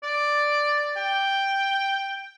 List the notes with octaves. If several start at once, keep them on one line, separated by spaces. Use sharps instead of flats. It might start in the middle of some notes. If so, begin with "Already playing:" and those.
D5
G5